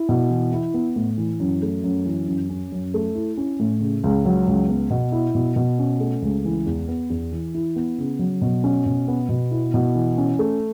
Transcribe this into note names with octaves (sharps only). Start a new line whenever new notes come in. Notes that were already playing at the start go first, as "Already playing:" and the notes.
Already playing: E4
B2
E3
E4
B3
A2
E3
F#2
A3
F#2
E3
F#2
C#4
F#2
A3
E4
C#4
A2
C#3
C#2
F#3
C#2
B3
B2
E4
B2
B2
C#4
A3
C#2
E3
E2
B3
E2
E3
E4
B3
C#3
F#3
B2
C#4
B2
B3
B2
E4
B2
E3
C#4
A3